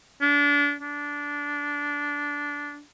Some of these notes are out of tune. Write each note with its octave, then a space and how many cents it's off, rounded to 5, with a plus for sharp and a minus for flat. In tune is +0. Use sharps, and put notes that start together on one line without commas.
D4 -30
D4 -15